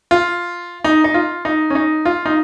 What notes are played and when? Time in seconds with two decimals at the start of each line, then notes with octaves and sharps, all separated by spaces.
0.11 F4
0.84 D#4
1.04 D#4
1.14 F4
1.45 D#4
1.70 C#4
1.75 D#4
2.05 F4
2.26 D#4